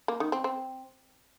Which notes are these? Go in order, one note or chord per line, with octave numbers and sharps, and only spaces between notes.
A#3
D#3
C4
C4